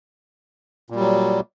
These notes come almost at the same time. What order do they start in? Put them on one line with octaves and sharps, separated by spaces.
A#2 G3 F#3